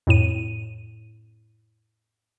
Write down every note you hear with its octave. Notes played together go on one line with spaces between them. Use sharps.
F2 A2 D#7